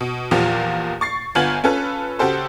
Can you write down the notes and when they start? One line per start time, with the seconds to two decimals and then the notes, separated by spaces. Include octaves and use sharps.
0.01 B2
0.31 E2 A#2 F3 G4 F5
1.01 C#6 A6 C7
1.35 G1 B3 F4 G#5 G#6 F#7
1.64 C#4 F4 A4 B4
2.19 C#3 F#4 G4 A4 C5